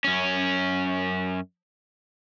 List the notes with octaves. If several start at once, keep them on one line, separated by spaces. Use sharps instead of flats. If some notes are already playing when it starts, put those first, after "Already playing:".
F#2 C#4